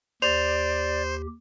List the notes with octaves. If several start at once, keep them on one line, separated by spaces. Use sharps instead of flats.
D#2 G4 C5 D5 F7